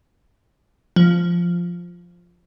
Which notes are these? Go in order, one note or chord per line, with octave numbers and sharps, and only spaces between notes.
F3